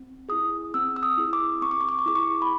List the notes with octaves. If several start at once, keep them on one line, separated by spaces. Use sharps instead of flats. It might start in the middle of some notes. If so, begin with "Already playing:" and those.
Already playing: C4
E4 G#4 D#6
C4 E6
E6
D#6
E4 G#4
D6
C4 C#6
D6
C#6
D6
C#6
E4 G#4 D6
C#6
B5